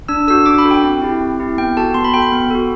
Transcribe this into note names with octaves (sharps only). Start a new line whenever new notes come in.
D4 E6
F#4 A4 E6
D4 D6
B5
F#4 A4
G5
C4
E4 G4
C4
E4 G4
B3 G5
F#4 A4 A5
B3 C6
B5
F#4 A4 G5
B5
B3
F#4 A4